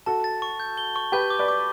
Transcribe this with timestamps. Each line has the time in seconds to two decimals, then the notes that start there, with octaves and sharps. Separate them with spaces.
0.06 F#4 A4 A5
0.24 A6
0.42 C#6
0.60 G6
0.78 G7
0.96 C#6
1.12 G4 B4 G6
1.30 D6
1.39 B4 D5
1.48 D6